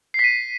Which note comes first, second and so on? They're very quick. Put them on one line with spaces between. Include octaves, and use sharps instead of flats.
C7 B6 D#7